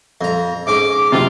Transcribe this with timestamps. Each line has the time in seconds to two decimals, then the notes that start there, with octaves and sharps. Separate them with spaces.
0.21 F2 A#5
0.67 G#2 C#4 D6
1.12 F#1 F#2 C3 F4